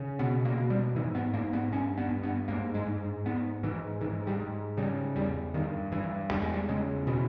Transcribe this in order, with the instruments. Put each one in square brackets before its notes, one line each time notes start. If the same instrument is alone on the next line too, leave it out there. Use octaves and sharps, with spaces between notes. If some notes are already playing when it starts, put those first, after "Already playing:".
Already playing: [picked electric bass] C#3
B2 B3
A#3
B2
G3
G#2 E3
B3
G#2 A#3
B3
G2 C#4
B3
G2
B3
G#2 A#3
G#3
G#2
G#2 B3
G#2 E3
G#2 E3
G3
G#2
C#3 G3
E2 G3
G2 D#3
G2 E3
E2 G3
G#3
G3
C#3 G#3
B2 E3